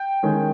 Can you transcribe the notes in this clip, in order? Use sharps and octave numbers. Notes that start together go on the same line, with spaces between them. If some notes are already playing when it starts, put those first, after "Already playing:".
Already playing: G5
D#3 G#3 C#4